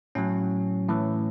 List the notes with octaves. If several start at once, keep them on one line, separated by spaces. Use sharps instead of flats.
A2 F#3 C#4
A2 E3